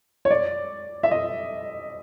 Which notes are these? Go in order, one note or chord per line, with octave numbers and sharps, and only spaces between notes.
C#5
D5
E5
D#5